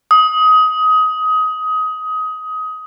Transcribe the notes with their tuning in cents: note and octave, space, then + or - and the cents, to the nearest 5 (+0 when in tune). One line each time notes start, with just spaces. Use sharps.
D#6 +20